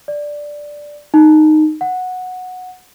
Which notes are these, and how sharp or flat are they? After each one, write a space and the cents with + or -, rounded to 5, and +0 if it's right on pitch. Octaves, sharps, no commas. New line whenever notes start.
D5 +0
D#4 -10
F#5 -10